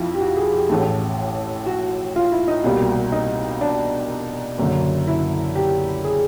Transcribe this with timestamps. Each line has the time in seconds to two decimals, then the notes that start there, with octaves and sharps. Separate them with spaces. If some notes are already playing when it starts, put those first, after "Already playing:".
Already playing: F2 E4 F4
0.15 G4
0.21 F#4
0.37 G#4
0.54 G4
0.69 A1 A2 E3 A3
1.66 F#4
2.16 F4
2.32 E4
2.48 D#4
2.64 C2 B2 G3 A#3
3.12 D#4
3.61 D4
4.59 F#1 F#2 D3
5.08 E4
5.56 G4
6.05 G#4